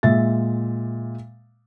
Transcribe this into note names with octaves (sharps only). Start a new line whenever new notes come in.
A#2 G#3 E5 A6